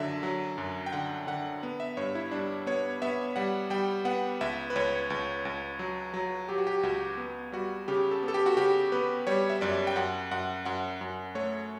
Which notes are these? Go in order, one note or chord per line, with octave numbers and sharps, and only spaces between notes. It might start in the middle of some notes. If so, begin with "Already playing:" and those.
Already playing: F#2 D3 F#3 E5
F#3
F#2
G5
D3 F#5
D3 F#5
B3
E5
G2 C#5
E4
G3 D4
B3 C#5
B3 E5
G3 F#5
G3 G5
B3 F#5
C#2 E5
B4
C#2 C#5
C#2
C#2
F#3
F#3
F#3 G4
F#4
G4
C#2 F#4
B3
G3 F#4
C#3 G4
A4
B3
A4
G4
F#4
C#3 G4
B3 B4
G3 C#5
E5
F#2 D5
G5
F#2 F#5
F#2 F#5
F#2 F#5
F#2
A3 C#5